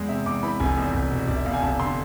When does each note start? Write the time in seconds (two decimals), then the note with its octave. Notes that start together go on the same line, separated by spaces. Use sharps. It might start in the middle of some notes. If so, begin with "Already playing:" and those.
Already playing: E2 G#3
0.09 C3 E5
0.26 E2 D6
0.43 E3 B5
0.60 F1 G#5
0.78 E2
0.94 F1
1.11 B2
1.28 F1 D5
1.36 E5
1.45 E2 F5
1.53 G#5
1.62 F1 A5
1.80 D3 C6